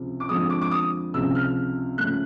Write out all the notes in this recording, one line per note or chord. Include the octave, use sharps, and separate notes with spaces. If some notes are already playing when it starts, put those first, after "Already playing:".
Already playing: C#2 C3 F3
D6
F2 D3 F3 G#3 D#6
D6
D6
D#6
C#2 C3 F3 E6
F6
C#3 F3 A3 F#6